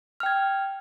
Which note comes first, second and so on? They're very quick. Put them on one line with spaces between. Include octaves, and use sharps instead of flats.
F6 G5 G#6